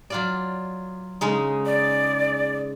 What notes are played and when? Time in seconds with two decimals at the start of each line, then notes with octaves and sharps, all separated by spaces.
0.10 F#3 F4 D5
1.21 C#3 G#3 D#4
1.66 D5